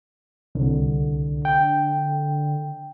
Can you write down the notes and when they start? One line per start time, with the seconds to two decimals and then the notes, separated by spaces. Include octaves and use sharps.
0.55 C2 D3
1.45 G5